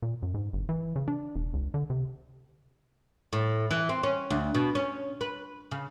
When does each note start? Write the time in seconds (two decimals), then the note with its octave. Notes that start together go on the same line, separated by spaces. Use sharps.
0.02 A#2
0.22 F#2
0.34 G#2
0.53 G1
0.69 E3
0.96 C#3
1.08 D4
1.36 E1
1.53 C#2
1.74 D3
1.90 C3
3.33 A2
3.71 E3
3.89 C4
4.03 C#4
4.30 D2
4.55 B2
4.75 C#4
5.21 B4
5.71 C#3